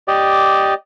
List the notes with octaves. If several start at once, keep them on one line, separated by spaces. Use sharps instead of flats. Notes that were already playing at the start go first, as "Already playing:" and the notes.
G4 D5 D#5